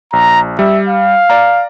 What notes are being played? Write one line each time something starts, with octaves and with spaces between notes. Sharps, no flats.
A#1 A#5
G3 E5
F5
D5 A#5